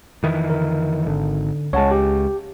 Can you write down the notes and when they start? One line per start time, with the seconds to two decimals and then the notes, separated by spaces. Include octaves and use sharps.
0.23 F2 D#3 E3
0.50 D3 A#4
1.07 G#1 D3
1.73 C#2 G#3 C#5 F#5 A5
1.91 G4